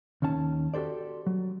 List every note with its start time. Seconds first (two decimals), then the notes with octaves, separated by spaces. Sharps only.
0.22 D#2 D#3 C#4 A5
0.74 F#4 G4 A4 C5 D5
1.26 F#3